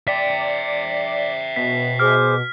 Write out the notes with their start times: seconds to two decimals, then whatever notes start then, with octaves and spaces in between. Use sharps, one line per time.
0.08 D5 E5 G5 B6
1.56 B2 B6
2.00 G#4 C5 D6 F6